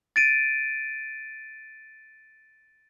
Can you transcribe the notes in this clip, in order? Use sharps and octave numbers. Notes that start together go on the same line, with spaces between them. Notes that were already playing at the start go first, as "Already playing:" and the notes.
A6 D7 D#7